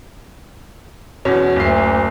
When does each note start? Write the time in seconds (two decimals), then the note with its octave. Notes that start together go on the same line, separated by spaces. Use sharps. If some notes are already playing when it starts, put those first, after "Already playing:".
1.25 E2 B2 C#4
1.56 F#1 D2 C7